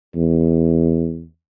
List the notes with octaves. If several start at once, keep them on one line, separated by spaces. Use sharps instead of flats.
E2